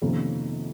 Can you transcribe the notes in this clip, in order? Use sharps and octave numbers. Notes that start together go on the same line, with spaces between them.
F2 C3 D#3 A#3 C#4